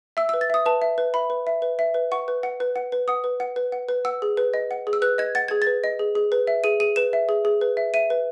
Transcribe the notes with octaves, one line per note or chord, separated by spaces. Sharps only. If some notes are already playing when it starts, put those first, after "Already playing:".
E5 E6
B4 E6
A6
E5 D#6
B4 A5
E5
B4
E5 B5
B4
E5
B4
E5
B4
F#5 C#6
B4
F#5
B4
F#5
B4
F#5 D#6
B4
F#5
B4
F#5
B4
F#5 E6
G#4
B4
D#5
F#5
G#4
E6
B4 F#6
D#5 G#6
F#5 A6
G#4 G#6
B4 A6
D#5
G#4
G#4
B4
E5
G#4 D#7
G#4 D#7
B4 E7
E5
G#4
G#4
B4
E5
E5 D#7
B4